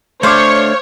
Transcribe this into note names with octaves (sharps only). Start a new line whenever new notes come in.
A3 D4 C5 C#5 F5 C6 D6